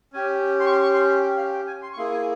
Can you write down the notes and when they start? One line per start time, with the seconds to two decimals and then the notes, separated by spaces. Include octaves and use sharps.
0.13 C#4 G4 G#5
0.60 C6
0.66 C#6
0.71 C6
0.83 C#6
0.94 C6
1.22 G5
1.37 F5
1.52 G5
1.67 G#5
1.83 C6
1.93 C#6
1.97 A#3 E4 G#4 C6
2.13 G#5